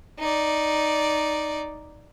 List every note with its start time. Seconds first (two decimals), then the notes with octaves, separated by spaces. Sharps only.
0.19 D#4 D5